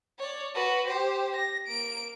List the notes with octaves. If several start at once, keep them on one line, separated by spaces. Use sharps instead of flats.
C#5 D5
F#4 B4
G4 C5
A#6
A#3 D7